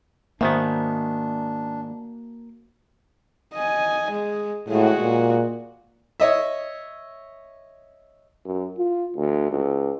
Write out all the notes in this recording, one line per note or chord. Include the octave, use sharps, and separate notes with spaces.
G#2 D#3 A#3 B3 D4 F#4 C5 E5
D#5 G#5
G#3
A2 G#3 F#4
A#2
C#5 D#5 E5
F#2
F4
D2
C#2